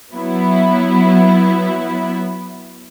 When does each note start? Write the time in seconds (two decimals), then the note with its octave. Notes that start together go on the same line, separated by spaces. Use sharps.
0.13 F#3 B3 E4